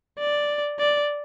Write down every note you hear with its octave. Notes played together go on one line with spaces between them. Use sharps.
D5
D5